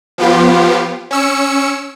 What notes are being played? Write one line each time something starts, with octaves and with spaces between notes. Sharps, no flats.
F3 B3 F4 G4
C#4 E6 C#7